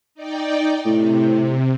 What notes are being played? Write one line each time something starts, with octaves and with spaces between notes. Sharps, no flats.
D#4 D5 G5
A2 C3